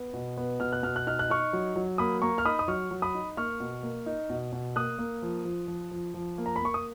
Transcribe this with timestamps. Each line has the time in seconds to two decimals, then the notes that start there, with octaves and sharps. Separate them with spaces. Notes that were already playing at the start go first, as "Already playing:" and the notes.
Already playing: B3
0.14 B2
0.37 B3
0.60 B2 F6
0.73 F#6
0.83 B2 F6
0.96 F#6
1.07 D#4 F6
1.19 F#6
1.29 D#4 C#6 F6
1.53 F#3
1.76 F#3
1.98 A#3 B5 D#6
2.22 A#3 A#5 C#6
2.38 F6
2.45 D#4 B5 D#6
2.59 D#6
2.68 F#3 C#6 F6
2.91 F#3
3.02 B5 D#6
3.15 D#4
3.37 A#3 C#6 F6
3.60 B2
3.83 A#3
4.06 D#4
4.30 B2
4.53 B2
4.76 A#3 D#6 F#6
4.99 A#3
5.23 F3
5.45 F3
5.68 F3
5.91 F3
6.14 F3
6.38 A#3
6.46 A#5
6.56 B5
6.61 A#3 C#6
6.74 D#6